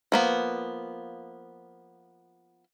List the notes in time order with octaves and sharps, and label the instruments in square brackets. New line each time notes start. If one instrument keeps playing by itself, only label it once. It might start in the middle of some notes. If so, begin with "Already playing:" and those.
[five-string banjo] F3 A#3 B3